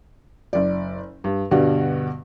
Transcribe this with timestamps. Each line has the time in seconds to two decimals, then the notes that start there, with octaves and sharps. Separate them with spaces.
0.53 F#1 D5
1.24 G2
1.51 G2 B2 D3 G3 F#4